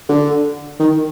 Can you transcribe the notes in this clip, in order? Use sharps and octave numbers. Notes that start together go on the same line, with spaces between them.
D3
D#3